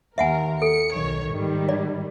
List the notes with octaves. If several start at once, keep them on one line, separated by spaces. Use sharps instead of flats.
D#2 A#4 E5 F#5 G#5
A4 C#7
B1 D#3 C#5
G#2 D#3 G3
D5